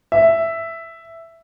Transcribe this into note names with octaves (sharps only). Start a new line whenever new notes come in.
E5